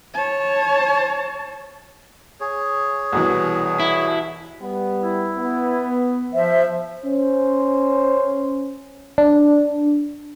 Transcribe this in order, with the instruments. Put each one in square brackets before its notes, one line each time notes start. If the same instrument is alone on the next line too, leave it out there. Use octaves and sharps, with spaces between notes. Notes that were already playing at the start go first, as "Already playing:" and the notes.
[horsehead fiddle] C#5 A5
[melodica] G#4 C#5
[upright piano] C2 B2 E3
[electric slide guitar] E4
[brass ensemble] G3 B3
[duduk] E4
[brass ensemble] B3
[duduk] F3 [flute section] C5 E5
[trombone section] C#4 C5
[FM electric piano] D4